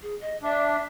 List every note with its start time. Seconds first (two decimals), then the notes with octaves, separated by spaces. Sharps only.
0.02 G#4
0.21 D#5
0.43 D4 E5